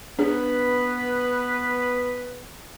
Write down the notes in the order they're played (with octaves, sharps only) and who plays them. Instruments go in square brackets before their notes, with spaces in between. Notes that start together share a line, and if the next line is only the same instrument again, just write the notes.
[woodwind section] B3 B4 [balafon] D4 G#4